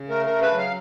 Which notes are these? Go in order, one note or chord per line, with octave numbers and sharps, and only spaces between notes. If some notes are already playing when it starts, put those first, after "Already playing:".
Already playing: C#3
A3 A#4
A#4
C#3
B4
F#3
F5